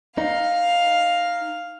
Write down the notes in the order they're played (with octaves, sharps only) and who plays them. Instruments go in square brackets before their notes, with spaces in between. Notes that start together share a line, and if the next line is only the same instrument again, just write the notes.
[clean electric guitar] D#4 [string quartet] F5